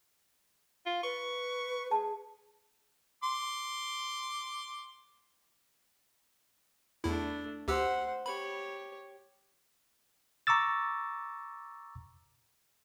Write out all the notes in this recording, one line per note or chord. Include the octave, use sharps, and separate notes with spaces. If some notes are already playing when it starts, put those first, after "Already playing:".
F4
B4 C#6
G#4 A5
C6 D6
E2 A3 D4 E4
D2 G4 C5 F#5 E6
G4 C#5 B5
A#5 C#6 D6 E6 A6